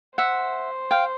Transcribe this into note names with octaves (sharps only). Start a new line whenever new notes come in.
C5 E5 F#5
F5 G5